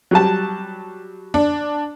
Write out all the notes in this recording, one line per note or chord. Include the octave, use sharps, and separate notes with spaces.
F#3 G3 A5
D4